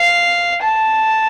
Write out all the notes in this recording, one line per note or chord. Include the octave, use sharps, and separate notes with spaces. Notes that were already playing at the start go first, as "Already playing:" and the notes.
Already playing: F5
A5